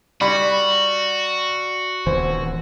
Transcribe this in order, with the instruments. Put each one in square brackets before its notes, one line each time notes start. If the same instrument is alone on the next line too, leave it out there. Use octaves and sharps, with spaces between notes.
[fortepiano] G3 B5 [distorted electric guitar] F#4 [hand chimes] D5
[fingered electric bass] D#1 E3 [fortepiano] C5